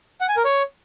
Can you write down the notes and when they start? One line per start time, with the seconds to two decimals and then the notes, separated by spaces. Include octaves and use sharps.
0.21 F#5
0.29 G#5
0.37 A#4
0.45 C#5